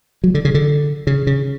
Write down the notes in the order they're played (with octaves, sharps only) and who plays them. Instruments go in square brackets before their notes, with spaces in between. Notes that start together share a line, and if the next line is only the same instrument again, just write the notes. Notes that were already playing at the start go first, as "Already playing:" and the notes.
[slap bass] F#3
D3
C#3
D3
C#3
C#3